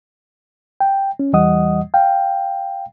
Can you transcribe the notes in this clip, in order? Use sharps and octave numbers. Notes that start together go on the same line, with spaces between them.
G5
C#4
E2 E3 G3 D#5 F#5 D#6
F5 G5